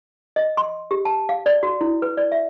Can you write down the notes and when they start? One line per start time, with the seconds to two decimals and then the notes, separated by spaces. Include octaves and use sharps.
0.36 D#5
0.57 C6
0.91 G4
1.05 A5
1.29 F5
1.46 D5
1.63 F#4
1.81 E4
2.02 B4
2.17 D5
2.32 E5